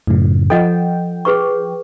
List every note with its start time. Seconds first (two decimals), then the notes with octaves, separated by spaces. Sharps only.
0.07 F#2 A2 C#3
0.50 F3 A4 D#5 F#5 G5
1.25 G#4 B4 C#6